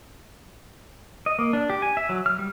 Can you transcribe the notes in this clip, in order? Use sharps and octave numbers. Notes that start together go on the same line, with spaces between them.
D#5
A#3
D4
G4
G#5
E5
F#3
F6
G3